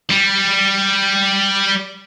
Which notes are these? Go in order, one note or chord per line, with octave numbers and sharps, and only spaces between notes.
G3